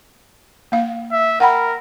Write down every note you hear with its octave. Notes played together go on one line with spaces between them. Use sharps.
A#3 F5
E5
A#4 F#5 G5 B5